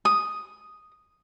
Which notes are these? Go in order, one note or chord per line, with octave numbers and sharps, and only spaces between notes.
D#6